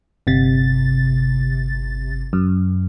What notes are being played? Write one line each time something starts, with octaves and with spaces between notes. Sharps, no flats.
G1 C3 A6
F#2